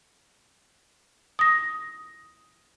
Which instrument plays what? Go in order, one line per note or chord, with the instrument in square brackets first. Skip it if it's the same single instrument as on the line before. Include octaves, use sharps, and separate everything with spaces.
[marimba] D#6 A#6